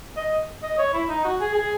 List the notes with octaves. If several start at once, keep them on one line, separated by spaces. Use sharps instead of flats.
D#5
D#5
C#5
E4
D#4
F#4
G#4
G#4